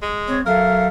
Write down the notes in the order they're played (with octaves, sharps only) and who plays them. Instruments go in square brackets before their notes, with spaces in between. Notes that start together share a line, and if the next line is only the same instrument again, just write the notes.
[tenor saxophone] G#3
[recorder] C4 [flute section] C#5
[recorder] F#3 [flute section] A4 E5 F5 [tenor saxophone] A#4